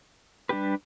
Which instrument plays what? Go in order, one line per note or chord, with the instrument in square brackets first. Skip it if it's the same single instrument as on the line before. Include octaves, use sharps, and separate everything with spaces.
[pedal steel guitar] G3 D4 G4 B4